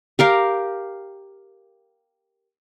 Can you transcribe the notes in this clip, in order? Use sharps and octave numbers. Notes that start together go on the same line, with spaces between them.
G4 A#4 F5